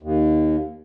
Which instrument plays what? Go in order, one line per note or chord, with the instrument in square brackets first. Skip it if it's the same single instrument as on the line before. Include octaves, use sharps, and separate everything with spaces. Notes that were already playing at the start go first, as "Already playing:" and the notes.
[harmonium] D#2